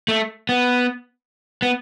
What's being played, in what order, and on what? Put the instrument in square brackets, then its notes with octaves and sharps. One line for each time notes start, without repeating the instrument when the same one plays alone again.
[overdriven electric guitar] A3
B3
B3